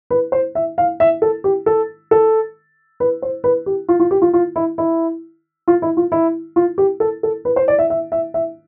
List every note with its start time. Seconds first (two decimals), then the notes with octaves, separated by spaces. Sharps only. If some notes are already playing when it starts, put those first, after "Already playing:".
0.10 B4
0.32 C5
0.55 E5
0.78 F5
1.00 E5
1.22 A4
1.44 G4
1.66 A4
2.11 A4
3.00 B4
3.22 C5
3.44 B4
3.66 G4
3.89 F4
4.00 F4
4.11 G4
4.22 F4
4.34 F4
4.56 E4
4.78 E4
5.68 F4
5.82 E4
5.97 F4
6.12 E4
6.56 F4
6.78 G4
7.00 A4
7.23 A4
7.45 B4
7.56 C5
7.68 D5
7.79 E5
7.90 E5
8.12 E5
8.34 E5